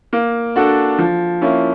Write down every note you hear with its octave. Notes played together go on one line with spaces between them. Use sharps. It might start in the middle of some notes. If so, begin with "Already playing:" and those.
A#3
D4 F#4 A4
F3
A#3 C#4 E4